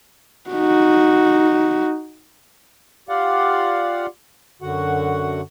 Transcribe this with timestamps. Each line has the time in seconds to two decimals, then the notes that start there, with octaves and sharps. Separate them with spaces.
0.50 D#4 F#4
3.09 F4 G4 D5 F5 F#5
4.62 F#2 D3 F#4 F#5